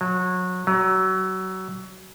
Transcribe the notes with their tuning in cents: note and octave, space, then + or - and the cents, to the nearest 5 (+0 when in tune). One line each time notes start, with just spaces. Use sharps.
F#3 -25
F#3 +25